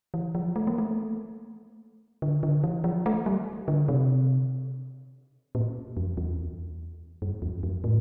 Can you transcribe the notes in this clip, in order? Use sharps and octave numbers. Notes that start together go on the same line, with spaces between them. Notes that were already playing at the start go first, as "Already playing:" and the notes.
E3
F3
A3
A#3
A3
D3
D3
E3
F3
A3
G3
D3
C3
A#2
F2
E2
G2
E2
F2
A2